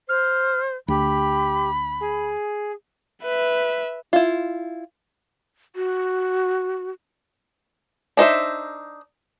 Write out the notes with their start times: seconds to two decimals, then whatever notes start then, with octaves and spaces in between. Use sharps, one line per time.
0.09 C5 F6
0.88 D2 G4 B5
2.00 G#4
3.23 B4 E5
4.13 E4 F4
5.76 F#4
8.17 D4 D#4 C5 E5